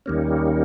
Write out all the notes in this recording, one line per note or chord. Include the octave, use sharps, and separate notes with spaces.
D#2 D#3 G3 A#3 C#4